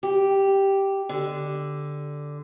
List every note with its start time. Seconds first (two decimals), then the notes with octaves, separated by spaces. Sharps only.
0.03 G4
1.09 D3